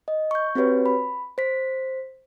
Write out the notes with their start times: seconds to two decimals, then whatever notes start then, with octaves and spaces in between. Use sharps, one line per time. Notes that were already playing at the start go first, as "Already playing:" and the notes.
0.08 D#5
0.31 C#6 G6
0.55 C4 F#4 G4 B4 C#5
0.86 B5
1.38 C5 B6